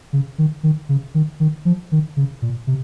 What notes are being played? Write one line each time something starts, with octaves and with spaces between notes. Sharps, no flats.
C#3
D#3
D#3
C#3
D#3
D#3
F3
D#3
C#3
A#2
C3